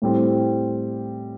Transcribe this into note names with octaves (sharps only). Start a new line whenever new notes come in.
A2 G3 C4